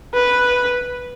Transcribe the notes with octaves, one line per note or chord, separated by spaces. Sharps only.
B4